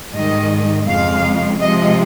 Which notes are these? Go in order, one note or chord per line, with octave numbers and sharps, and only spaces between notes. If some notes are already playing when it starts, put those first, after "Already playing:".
G#2 D#3 G3 D#5
F2 C#3 G#3 F5
C3 F3 G#3 D#5